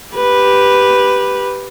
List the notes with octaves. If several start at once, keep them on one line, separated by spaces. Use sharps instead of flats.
G4 B4